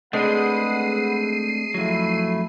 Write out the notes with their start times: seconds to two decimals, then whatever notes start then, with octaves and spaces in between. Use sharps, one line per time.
0.13 G#3 A3 C4 D4 B4 F#5 C7 D#7
1.74 F2 F#3 A3 E4